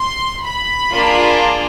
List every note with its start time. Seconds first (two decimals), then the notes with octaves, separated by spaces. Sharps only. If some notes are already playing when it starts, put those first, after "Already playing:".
Already playing: C6
0.44 B5
0.94 A#3 D4 F4 G#4